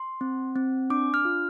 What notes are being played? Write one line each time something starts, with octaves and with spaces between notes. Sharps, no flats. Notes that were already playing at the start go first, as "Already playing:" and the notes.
Already playing: C6
C4
C4
D4 D6
F6
F4